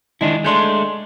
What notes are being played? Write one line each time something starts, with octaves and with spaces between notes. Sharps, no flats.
D#3 G#3 D4 E4
G#3 A3 D4 C6 G6